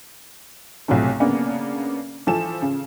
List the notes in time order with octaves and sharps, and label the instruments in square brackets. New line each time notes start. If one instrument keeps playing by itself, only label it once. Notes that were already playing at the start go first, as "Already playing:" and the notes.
[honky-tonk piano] B1 C3 F3 F#3 A3
C#3 A#3 B3 D4
E3 F3 A4 E7
C#3